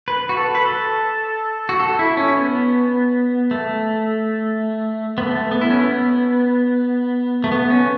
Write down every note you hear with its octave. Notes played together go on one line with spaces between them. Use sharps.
B4
F#4
A4
B4
A4
F#4
A4
E4
C#4
B3
A3
B3
A3
B3
E4
C#4
B3
A3
B3
C#4